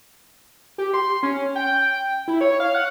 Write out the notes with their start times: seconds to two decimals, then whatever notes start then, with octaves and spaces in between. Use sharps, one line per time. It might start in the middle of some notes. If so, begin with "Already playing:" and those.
0.78 G4
0.94 C6
1.23 C#4
1.56 G5
2.28 E4
2.41 C#5
2.60 F5
2.74 F#5